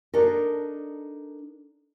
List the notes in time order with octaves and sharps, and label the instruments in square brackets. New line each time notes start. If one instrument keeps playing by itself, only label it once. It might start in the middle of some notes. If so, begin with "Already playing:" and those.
[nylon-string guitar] D4 D#4 A4 A#4